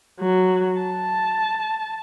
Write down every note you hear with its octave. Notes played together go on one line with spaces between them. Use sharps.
F#3
A5